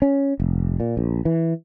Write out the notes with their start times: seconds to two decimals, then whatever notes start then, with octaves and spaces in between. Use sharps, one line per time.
0.02 C#4
0.40 F1
0.80 A#2
0.97 A#1
1.25 E3